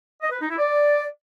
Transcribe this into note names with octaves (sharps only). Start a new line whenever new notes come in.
D#5
B4
D#4
E4
D5